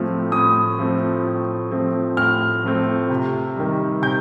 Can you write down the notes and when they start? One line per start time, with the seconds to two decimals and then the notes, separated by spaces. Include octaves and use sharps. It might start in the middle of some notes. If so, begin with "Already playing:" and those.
Already playing: A2 F3 A3 C4
0.32 A2 D#6
0.79 F3 A3 C4
1.25 A2
1.71 F3 A3 C4
2.17 A2 F6
2.63 F3 A3 C4
3.10 C3
3.56 D#3 G3
4.02 C3 G6